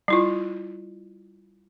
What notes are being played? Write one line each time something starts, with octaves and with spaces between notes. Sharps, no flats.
G3 E4 F4